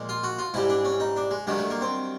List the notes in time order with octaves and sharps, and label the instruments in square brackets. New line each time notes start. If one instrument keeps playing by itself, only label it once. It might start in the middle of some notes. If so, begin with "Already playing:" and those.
Already playing: [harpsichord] A#2 F3 G#3
F4
F#4
F4
G#2 E3 G3 E4
D4
C#4
D#4
D4
G#3
G2 D#3 F#3 G#3
A3
A#3
C4